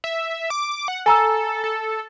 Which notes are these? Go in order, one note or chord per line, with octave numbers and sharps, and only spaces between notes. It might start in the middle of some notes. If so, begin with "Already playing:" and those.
E5
D6
F#5
A4 G#5 A#5 E6
A4